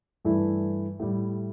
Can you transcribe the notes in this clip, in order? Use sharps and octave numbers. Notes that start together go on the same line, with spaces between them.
G2 E3 A3 E4
A2 G3 E4